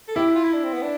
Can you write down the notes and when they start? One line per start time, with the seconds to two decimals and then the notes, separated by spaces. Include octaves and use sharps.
0.08 A4
0.16 E4 G4
0.35 F4
0.44 E4
0.53 D4
0.63 C4
0.73 B3
0.82 D4